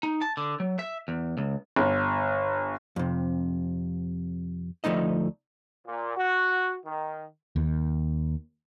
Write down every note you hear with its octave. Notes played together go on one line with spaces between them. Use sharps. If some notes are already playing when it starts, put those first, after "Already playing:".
D#4
A5
D3
F#3
E5
E2
C#2
G1
F2 C3
D2 F3 A3 D#4 D#5
A#2
F#4
D#3
D#2